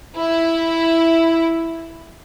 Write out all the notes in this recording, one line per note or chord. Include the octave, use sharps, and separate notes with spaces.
E4